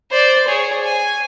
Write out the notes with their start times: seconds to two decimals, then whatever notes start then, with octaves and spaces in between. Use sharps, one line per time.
0.11 C5 D5
0.48 G#4 C#5
0.83 G#5